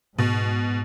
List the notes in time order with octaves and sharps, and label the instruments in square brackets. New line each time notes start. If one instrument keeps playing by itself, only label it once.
[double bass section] G#2 [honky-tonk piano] B2